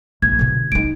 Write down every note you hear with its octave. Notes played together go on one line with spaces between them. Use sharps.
A#1 G#6
B2 D3
G3 D#4 D7